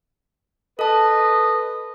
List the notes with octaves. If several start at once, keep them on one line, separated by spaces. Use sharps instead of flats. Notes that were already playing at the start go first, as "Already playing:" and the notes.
A4 B4 D#5 A5